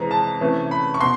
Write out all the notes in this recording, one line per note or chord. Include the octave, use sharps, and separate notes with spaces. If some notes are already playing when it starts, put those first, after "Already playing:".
Already playing: F2 C3 E3 G#3 A#5
A5
C3 E3 A3 C#4
B5
C#6
B2 C6